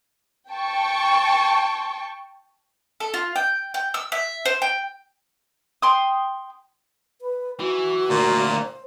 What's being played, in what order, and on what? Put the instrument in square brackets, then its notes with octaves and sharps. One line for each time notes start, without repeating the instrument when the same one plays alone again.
[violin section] G5 A5 C#6
[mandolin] A4
F4
G5
G5
E6
E5
C5
G5
G5 C6 D#6
[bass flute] B4
[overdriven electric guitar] E3 [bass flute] F#4
[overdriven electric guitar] D2 A#3 [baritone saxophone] A#2
[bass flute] C5